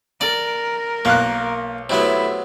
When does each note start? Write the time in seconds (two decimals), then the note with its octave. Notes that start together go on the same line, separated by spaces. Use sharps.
0.21 A#4 D5
1.05 B1 A#3 F5 F#6
1.90 C3 F#3 A3 B3 E4